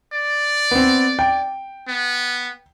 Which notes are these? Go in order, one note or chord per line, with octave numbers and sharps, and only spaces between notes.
D5
B3 C4
G5
B3